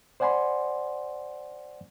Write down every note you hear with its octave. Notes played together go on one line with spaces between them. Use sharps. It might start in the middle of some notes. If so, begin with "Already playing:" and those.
C5 D5 F#5 G#5 B5 C6